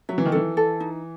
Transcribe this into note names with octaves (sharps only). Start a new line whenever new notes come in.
F#3 E5
E3
D#3
E3 A4
A4
D#4